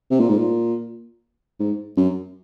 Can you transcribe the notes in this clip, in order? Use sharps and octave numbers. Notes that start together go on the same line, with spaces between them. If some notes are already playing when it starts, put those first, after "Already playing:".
C3
A#2
G#2
A#2
G#2
F#2